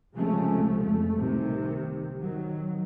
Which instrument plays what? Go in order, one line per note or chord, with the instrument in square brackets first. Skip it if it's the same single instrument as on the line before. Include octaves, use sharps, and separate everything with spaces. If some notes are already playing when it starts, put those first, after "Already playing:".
[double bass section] C#2 C3 F3 G#3 A3 C#4
F2 A3
C2 C3 D#3
D#3 F#3